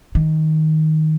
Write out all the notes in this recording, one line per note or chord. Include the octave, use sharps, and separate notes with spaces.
D#3